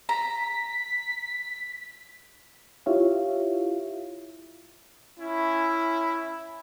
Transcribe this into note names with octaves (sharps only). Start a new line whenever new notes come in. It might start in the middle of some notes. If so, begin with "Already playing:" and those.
A#5 B6
E4 F4 G4 C#5 E5 F5
C#4 E4